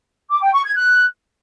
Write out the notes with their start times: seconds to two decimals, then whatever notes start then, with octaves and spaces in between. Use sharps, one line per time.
0.30 D6
0.41 G5
0.53 C#6
0.64 G#6
0.75 F#6